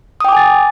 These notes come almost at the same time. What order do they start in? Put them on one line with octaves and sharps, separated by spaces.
D#6 G5 D6 G#5 A6